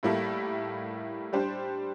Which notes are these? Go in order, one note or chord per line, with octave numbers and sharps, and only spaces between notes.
A2 G3 A#3 E4 A4
G3 D4 G4 C5